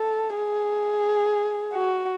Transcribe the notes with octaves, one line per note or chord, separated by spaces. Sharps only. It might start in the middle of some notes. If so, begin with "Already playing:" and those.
Already playing: A4
G#4
F#4